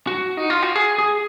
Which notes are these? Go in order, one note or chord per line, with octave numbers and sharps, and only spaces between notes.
F#4
D#4
F4
F#4
G#4
G#4